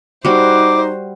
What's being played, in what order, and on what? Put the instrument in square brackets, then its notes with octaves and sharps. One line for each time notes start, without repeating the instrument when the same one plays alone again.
[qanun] G3 F#4 [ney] D#4 [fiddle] C5 [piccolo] D6